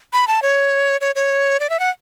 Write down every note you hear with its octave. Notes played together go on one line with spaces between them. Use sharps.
B5
A5
C#5
C#5
C#5
D5
E5
F#5